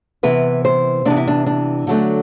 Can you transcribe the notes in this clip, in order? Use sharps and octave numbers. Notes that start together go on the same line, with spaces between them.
C3 E3 B3 B4
C5
C3 E3 B3 D4
E4
D4
D4
D3 F#3 A3 D4